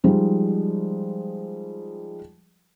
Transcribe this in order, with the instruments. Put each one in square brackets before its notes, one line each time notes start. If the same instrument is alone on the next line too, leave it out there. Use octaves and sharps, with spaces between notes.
[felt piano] F3 G3 G#3 D#4